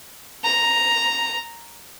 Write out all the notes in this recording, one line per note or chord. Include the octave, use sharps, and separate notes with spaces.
A#5